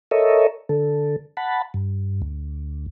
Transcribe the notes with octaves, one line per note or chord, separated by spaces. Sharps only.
A4 A#4 C#5 D#5 E5
D3 A4
F#5 A5 B5
G2
D2